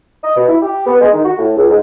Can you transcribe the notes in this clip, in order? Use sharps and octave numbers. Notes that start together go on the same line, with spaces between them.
D#5
B2
E4
G4
B3
G#3
D#3
F#4
A2
C#2
G#2